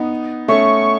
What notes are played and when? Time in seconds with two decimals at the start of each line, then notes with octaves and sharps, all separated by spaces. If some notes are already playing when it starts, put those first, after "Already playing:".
Already playing: B3 D#4
0.48 A3 C#4 C#6